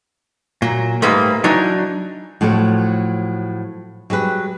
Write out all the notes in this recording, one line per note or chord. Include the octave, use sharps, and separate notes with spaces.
A#2 F#3
G#2 G3 A3 A#3 B4
E3 F#3 D4 D#4 C#5
A2 F3 F#3 A4 C#5
F#3 G3 G#4 B4